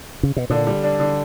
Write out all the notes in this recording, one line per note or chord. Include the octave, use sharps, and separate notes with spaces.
C#3
B2
A#2 D3
G3
D4
D3